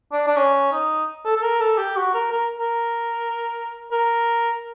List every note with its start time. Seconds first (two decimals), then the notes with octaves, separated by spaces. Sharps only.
0.12 D4
0.27 D4
0.36 C#4
0.72 D#4
1.25 A4
1.36 A4
1.43 A#4
1.60 A4
1.78 G4
1.96 F#4
2.14 A#4
2.32 A#4
2.59 A#4
3.92 A#4